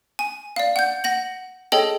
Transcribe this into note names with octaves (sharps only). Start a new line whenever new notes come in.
G#5
D5 F5
F#5 G6
F#5 A#6 F#7
G#4 A4 C#5 D#5 G5 A5